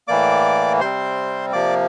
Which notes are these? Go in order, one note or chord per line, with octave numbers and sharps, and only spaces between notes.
A2 E3 A#3 D5 D6
C3 G3 C4 C5 C6
C3 F3 A#3 D5 D6